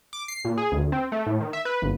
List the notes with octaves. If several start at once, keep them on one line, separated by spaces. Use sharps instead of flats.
D6
C7
A#2
G#4
D2
C4
A3
A2
D#3
E5
B4
G1